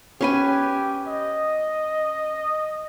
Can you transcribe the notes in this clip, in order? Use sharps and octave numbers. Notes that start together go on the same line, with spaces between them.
C#4 G4 B4 G#5
D#5